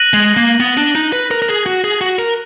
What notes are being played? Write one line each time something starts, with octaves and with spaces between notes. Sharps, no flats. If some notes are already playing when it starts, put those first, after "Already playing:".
Already playing: F#6 A#6 D#7 F#7
G#3
A#3
B3
D4
D#4
B4
A#4
A#4
G#4
F#4
G#4
F#4
A#4